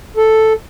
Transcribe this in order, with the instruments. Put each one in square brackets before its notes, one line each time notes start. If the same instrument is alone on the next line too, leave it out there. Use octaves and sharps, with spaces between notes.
[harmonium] A4